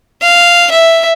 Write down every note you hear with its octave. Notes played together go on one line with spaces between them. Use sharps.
F5
E5